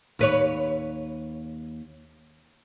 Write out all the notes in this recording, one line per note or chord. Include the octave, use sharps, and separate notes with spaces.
D#2 B4 C#5